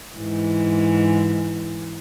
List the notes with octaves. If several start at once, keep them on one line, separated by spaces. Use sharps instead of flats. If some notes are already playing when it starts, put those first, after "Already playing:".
G#2 E3